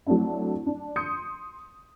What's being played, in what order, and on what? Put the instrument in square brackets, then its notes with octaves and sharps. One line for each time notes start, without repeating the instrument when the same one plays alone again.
[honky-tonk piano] F#3 A3 C4 D4 E4
D4
C6 D#6 G6 C#7